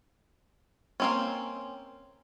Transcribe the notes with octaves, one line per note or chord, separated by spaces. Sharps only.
A#3 C4 C#4